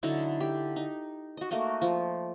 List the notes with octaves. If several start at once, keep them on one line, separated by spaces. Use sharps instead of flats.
D3 F#3 D#4 E4
G4
D#4
F#4 D#5
A3 A#3 F#4 D#5
F3